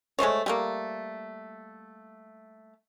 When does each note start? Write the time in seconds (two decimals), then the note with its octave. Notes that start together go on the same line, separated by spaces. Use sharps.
0.19 G#3 A3 C5 C#5
0.46 G3 A3 A#3